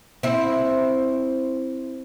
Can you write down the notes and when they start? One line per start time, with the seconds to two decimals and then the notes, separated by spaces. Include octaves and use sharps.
0.23 C4 E4